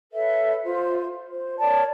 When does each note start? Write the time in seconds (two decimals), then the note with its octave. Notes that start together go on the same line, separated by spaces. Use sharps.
0.12 A4 B4 C#5 E5
0.62 F4 C5
1.29 C5
1.59 A#4 C#5 D5 A5